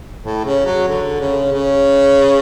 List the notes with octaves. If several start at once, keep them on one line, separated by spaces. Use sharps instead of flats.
A2
C#3
F#3
D3
C#3
C#3